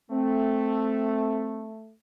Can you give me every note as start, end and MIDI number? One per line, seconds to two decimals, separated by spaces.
0.11 1.93 57
0.11 1.71 60